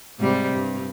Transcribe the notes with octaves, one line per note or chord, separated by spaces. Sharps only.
G#2 C3 G3
G2